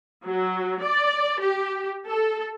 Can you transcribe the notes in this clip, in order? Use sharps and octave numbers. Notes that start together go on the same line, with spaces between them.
F#3
D5
G4
A4